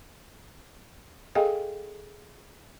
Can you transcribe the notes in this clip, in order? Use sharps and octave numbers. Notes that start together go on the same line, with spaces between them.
G#4 A4 D#5 F5 G5 G#5